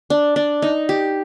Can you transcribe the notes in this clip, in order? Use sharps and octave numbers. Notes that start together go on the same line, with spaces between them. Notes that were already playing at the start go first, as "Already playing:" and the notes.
D4
D4
D#4
G4